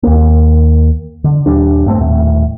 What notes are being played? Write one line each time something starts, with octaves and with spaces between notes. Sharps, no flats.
D#2 A#3
D3
D#1 G#1 G3 D4
G2 A3 C4
D#1 A2